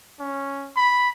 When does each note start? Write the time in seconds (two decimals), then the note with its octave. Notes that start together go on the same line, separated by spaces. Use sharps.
0.19 C#4
0.76 B5